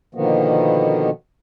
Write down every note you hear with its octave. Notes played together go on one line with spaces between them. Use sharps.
B2 D3 D#3 F3 A#3 B3